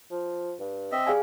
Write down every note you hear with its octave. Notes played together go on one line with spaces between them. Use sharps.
F3
G2
C4 D#5 E5
G3 G#4 F5 G#5